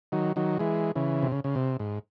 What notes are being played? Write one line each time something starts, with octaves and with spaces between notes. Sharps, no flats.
D#3 F#3
D#3 F#3
E3 G#3
C#3 E3
C3
C#3
C#3
C3
G#2